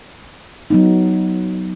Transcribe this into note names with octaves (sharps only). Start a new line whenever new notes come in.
F#3 B3 D#4